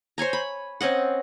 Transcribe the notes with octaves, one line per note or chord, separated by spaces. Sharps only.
C5 C#5 G#5 A#5
B5
C4 C#4 D#5 F#5